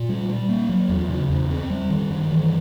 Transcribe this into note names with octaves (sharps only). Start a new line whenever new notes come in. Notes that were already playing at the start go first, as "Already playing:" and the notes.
Already playing: A#2
G3
G3
A#3
F#3
E2
C#3
E2
C4
G3
D#3
G2
E3